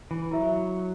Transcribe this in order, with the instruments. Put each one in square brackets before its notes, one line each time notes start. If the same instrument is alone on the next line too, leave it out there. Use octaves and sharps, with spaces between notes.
[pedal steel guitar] E3
[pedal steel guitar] F#3 [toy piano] E4 A#4 E5